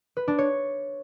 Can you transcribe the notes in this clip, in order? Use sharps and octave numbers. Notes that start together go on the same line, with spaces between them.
B4
D4
C#5